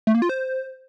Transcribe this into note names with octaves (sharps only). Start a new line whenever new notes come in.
A3
A#3
F4
C5